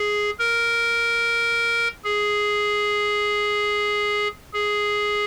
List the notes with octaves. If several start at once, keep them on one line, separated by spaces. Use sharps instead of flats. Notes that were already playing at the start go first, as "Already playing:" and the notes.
Already playing: G#4
A#4
G#4
G#4